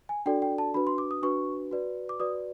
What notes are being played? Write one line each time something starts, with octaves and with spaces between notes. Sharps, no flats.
G#5
D4 F#4 A4 D5 G5
G5
A5
D4 F#4 B4 B5
C6
D6
D#6
D4 F#4 B4 C#6
F#4 B4 D5
D6
F#4 B4 D5 D#6